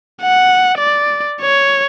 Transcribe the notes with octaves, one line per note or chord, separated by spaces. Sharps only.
F#5
D5
C#5